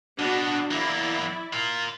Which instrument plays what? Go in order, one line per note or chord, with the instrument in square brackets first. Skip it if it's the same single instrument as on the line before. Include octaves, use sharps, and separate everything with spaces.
[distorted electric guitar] B2 [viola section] D4 F#4
[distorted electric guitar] E2 A#3 [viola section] E4 D5
[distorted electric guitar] F4 A#4